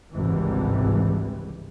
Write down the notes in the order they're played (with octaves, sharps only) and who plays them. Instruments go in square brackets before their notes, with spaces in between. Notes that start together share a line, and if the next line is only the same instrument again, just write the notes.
[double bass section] G#1 C#2 G2 C3 E3 G3